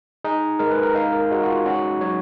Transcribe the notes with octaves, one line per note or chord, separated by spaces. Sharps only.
D#4 G#4
G#3 A#4
B4
A#4
D#4 F5
A#4
G#3 F#4
F#4
F4
C#4 F#4
F#3 C#5